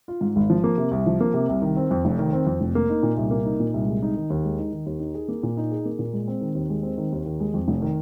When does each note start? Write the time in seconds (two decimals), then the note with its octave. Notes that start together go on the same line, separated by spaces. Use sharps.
0.08 F4
0.21 G#2
0.36 G#1
0.50 F3
0.64 A#3
0.78 C3
0.91 C2
1.06 F3
1.21 A#3
1.34 C3
1.49 C2
1.62 D#3
1.77 C4
1.91 F2
2.05 F1
2.19 D#3
2.33 C4
2.46 F2
2.61 F1
2.75 A#3
2.90 D#4
3.03 A#2
3.17 C2
3.31 A#3
3.45 D#4
3.60 A#2
3.74 C2
3.87 G#3
4.02 D#4
4.16 D#3
4.30 D#2
4.44 G#3
4.59 D#4
4.72 D#3
4.86 D#2
5.00 D#4
5.15 G#4
5.28 A#3
5.43 A#2
5.57 D#4
5.71 G#4
5.85 A#3
5.99 A#2
6.13 G#3
6.28 C4
6.41 D#3
6.55 D#2
6.70 G#3
6.83 C4
6.98 D#3
7.12 D#2
7.26 D#3
7.40 G#3
7.54 F2
7.68 F1
7.82 D#3